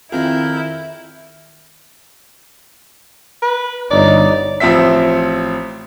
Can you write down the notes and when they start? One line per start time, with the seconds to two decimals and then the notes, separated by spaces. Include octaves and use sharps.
0.12 F2 D#3 C4 E4 F4 G#4 A#4 G6
3.42 B4
3.90 G1 D#4 C#5 D5
4.60 A1 F3 C4 E5 B6